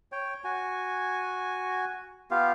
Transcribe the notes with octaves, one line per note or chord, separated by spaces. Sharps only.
C#5 G5
F#4 G#5
B3 F4 G4 F5